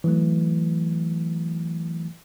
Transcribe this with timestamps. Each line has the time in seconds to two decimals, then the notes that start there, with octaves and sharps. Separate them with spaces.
0.04 E3 F#3 A3